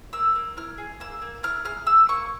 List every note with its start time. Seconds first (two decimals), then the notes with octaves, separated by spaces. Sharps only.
0.13 A#3 E6
0.35 A#3
0.57 E4 F6
0.78 G#4
1.00 A#3 E6
1.22 A#3
1.43 E4 F6
1.65 G#4 F6
1.86 A#3 E6
2.09 A#3 C#6